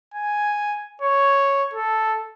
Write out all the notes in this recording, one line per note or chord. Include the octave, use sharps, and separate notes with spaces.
G#5
C#5
A4